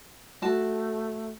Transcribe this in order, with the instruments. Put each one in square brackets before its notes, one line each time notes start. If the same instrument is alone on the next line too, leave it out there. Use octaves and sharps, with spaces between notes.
[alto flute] A3 [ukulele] F#4 A5